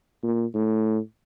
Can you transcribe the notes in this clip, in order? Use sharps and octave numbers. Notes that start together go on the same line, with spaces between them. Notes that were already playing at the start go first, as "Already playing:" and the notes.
A#2
A2